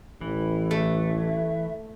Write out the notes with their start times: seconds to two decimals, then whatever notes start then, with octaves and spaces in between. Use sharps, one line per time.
0.21 A1 E3
0.71 A3 E5